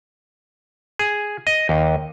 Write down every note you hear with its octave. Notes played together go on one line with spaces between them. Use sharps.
G#4
D#5
D#2